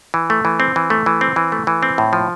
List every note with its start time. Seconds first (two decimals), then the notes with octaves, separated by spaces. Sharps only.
0.14 E3
0.30 A3
0.45 E3
0.60 C4
0.76 E3
0.90 A3
1.06 E3
1.21 C4
1.36 E3
1.52 A3
1.67 E3
1.83 C4
1.98 A2
2.13 F3